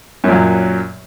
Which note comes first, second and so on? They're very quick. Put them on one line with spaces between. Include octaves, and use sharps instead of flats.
F#2 A#2 F#3